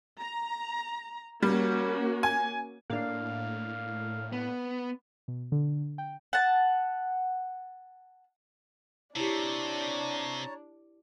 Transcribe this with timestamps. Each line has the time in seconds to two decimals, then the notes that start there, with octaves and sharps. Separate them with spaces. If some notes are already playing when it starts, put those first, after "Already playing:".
0.20 A#5
1.42 G3 A#3 C#4 F#4
2.23 G#5
2.90 A2 A#3 D4 F5
4.33 B3
5.28 B2
5.52 D3
5.98 G5
6.33 F#5 A5
9.16 C3 D4 E4 G4 C#5 A5 A#5